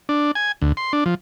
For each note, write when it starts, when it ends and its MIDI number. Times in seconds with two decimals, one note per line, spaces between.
0.09 0.31 62
0.35 0.52 80
0.62 0.72 38
0.77 0.93 84
0.93 1.04 62
1.06 1.15 53